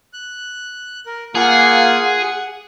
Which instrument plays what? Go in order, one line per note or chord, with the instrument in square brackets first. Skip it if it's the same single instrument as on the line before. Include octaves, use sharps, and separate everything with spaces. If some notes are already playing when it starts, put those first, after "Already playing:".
[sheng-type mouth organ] F#6
A#4
[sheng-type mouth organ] A#3 F4 F#5 [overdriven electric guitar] G#4
[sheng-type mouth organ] F#5